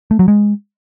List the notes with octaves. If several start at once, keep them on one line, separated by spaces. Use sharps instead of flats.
A3
F#3
G#3